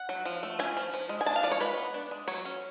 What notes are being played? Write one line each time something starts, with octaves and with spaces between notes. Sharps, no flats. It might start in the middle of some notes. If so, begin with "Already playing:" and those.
Already playing: F#5
F#3
F3
A3
C#4 G#5
F3
F3
G#3
G#5
D4 A5
F5
F3 D5
C#5
G#3 B4
B3
D4
G#3
F#3 C#5
C#4